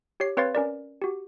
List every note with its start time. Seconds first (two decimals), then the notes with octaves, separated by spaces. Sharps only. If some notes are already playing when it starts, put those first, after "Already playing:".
0.20 G4 C#5 C7
0.37 C4 B4 C#5 F5 C6 A6
0.55 C#4 A#4 D5
1.02 F#4 G4